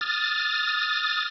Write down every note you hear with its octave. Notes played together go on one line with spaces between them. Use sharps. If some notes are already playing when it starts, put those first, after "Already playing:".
D#6 F6 A6